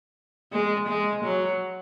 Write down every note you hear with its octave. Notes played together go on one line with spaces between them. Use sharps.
G#3
G#3
F#3